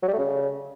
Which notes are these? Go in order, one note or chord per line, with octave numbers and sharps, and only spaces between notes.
F#3
G3
A3
C#3